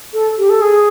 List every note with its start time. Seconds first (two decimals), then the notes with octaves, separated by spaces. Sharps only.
0.13 A4
0.38 G4
0.50 A4
0.62 G#4